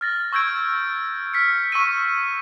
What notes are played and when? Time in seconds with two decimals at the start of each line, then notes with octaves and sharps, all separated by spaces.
0.01 F6 A6 A#6
0.32 C#6 E6 G6 G#6 D7
1.34 F6 B6 C#7
1.72 C#6 E6 B6 D#7